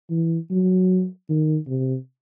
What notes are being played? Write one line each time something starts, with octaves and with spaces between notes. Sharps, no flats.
E3
F#3
D#3
C3